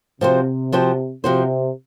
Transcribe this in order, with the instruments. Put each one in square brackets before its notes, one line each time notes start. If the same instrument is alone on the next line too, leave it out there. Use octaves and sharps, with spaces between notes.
[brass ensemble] C3 [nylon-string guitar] F3 C4 F#4 C5
[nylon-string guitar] F3 C4 F#4 C5
[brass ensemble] C3 [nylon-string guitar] F3 C4 F#4 C5